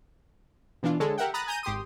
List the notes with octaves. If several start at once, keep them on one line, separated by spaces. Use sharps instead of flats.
B2 E3 D4 F4
D3 G#3 A4 C#5
G4 A#4 E5 F#5 G5
A#5 B5 D#6 F#6 A6
G#5 A#5 G6 D#7
G#1 G4 C6 D#6